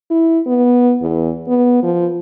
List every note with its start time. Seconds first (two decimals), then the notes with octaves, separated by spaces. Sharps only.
0.10 E4
0.46 B3
1.02 E2
1.48 B3
1.83 F3